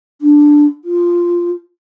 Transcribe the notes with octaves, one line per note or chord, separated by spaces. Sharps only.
D4
F4